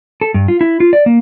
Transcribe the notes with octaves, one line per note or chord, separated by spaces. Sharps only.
A4
G2
F4
E4
F4
D5
A#3